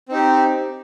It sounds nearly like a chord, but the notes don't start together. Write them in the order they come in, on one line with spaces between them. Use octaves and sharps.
C4 D#4 G4